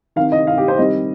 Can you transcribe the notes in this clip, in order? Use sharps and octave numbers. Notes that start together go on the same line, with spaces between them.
D#3 C4 F5
D#5
F5
G4
C5
D#3 G3 C4 D#5